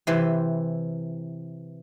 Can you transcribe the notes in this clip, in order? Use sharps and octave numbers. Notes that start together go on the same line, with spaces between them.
C3 E3 C5